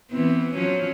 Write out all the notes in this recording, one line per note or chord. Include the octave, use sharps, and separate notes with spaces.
E3 B3 C4
F3 F#3 C#4